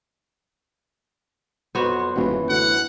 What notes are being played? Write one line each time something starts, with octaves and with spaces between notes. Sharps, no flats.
F2 F#3 B3 F#4 C5
D#1 F#2 E3
D2 F#5